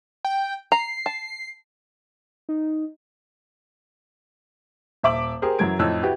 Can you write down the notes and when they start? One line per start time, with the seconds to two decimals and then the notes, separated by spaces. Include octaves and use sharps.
0.25 G5
0.72 A#5 C7
1.06 A5
2.49 D#4
5.03 D#1 E5 D6 F#7
5.42 G4 G#4 A#4 C5
5.59 F#2 E3 F#3 G#6 D7
5.79 F2 A2 D#4 C#5 E6 F#6
6.03 E4 F#4 G4 B4